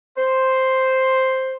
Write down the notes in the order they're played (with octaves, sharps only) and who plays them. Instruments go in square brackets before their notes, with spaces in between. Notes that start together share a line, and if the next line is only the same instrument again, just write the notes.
[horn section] C5